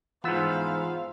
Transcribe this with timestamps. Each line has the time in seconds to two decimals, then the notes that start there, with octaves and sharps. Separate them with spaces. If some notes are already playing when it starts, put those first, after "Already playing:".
0.24 G#2 E3 B3 F4 C5 F5 E6